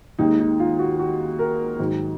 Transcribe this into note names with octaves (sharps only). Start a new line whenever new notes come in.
D#2 D#3 G#3 D#4
D#4
F4
F#4
F#4
A#4
G#2 D#3 F#3